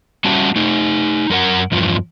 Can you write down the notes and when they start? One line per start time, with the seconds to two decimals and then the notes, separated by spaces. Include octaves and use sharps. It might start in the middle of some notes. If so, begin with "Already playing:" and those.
0.25 G3 C#4 F#4 E5 F#5 A5
0.56 A3 D#4
1.30 F#2 A#4 F#5
1.72 E2 G2 F3